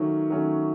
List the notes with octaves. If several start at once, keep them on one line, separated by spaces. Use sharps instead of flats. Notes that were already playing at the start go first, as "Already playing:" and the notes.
Already playing: D#3 F#3 A3 C#4 C#6
D#3 F#3 A3 C#4